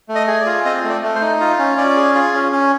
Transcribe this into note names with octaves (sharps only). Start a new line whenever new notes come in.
A3
D#5
G#4
D5
F4
C4 D#5
A3
D5
A3
C5
D#4
F4
C#4
C#4 D5
G#4
F4
C#4
C#4